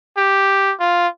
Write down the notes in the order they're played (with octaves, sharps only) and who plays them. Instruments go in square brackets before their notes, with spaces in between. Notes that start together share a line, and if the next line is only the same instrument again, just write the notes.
[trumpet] G4
F4